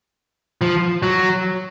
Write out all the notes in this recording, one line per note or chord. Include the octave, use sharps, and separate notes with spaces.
F3
F#3